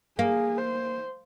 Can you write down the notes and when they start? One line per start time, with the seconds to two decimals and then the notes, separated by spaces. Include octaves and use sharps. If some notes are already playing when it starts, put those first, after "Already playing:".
0.19 A#3 G#4
0.58 C5